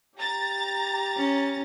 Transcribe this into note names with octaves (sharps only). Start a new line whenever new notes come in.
G4 A#5 A6
C#4